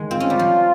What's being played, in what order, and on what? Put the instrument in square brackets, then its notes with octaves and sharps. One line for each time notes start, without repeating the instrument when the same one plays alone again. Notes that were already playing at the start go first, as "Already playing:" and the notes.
Already playing: [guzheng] D#3 G#3
[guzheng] C4 [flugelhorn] F4
[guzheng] C#4
G3
F3